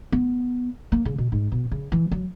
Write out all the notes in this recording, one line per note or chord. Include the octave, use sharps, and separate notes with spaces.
B3
A#3
C#3
B2
G#2
B2
C#3
E3
F#3